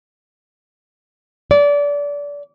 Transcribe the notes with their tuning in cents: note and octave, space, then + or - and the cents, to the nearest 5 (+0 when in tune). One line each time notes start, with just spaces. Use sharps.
D5 -25